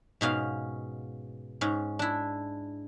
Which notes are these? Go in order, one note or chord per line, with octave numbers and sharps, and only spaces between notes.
G#2 B2 C#4 F5
G#2 C#4
D4 E4